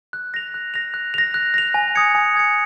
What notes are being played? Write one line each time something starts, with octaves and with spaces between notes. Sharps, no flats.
F#6
A#6 F7
F#6
A#6 F7
F#6
A#6 F7
F#6
A#6 F7
G#5
D#6 G#6 C#7
G#5
D#6 G#6 C#7